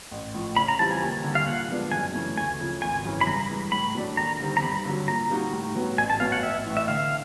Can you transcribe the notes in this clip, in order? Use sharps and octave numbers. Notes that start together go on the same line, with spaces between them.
A1
A2 F3
C#3 B5
A#5
E3 G3 C4 F4 A5
G#5
D#2
D3 G3
F5
A#2 F#5
F3 G#3 B3 D4
F#2 G#5
C#3 E3 A3
D2 G#5
C#3 F3
G#1 G#5
F#2 C#3 E3
B5
G2 A#5
E3 G#3
A2 B5
F#3 A3 D4
D#2 A#5
D3 G3 C4 D#4
A#5
G2 B5
D3 F#3
A#2 A#5
G3 A#3 D#4 F#4
A2
F#3 B3
A1 G#5
A5
A2 F#3 B3 F5
F#5
A1 E5
A2 E3
E5
D3 F5